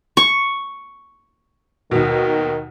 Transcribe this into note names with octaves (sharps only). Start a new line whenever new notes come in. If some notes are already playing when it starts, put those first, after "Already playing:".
C#6
D#2 B2 D#3